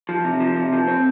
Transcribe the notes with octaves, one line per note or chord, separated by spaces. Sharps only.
F3
C3
F3
C3
F3
C4